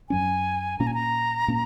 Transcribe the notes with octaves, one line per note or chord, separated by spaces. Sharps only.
F#2 F#3 C#4 G#5
A#2 A#3 C#4 A#5
G#5
A#5
A#2 A#3 C#4